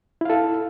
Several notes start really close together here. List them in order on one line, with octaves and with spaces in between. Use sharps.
E4 F5 A4